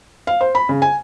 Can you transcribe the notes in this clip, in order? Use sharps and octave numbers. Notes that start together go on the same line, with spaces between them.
F5
C5
B5
C#3
G#5